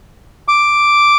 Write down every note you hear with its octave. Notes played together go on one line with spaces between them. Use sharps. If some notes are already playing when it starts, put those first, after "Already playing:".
D6